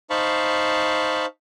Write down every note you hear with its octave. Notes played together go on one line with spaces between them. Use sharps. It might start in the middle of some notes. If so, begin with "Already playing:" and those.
D#4 C5 F5 A5 B5 C#6